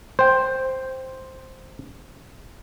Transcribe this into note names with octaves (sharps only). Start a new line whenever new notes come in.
C5 G5